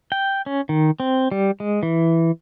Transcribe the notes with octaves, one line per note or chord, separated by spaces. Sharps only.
G5
C#4
D#3
C4
G3
G#3
E3